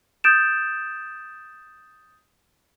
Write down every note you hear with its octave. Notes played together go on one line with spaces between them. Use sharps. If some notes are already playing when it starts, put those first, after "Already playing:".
D#6 G6 A6 D7 E7